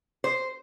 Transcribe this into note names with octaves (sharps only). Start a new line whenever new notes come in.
C5